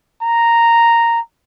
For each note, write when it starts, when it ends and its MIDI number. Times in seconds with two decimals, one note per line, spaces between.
0.22 1.20 82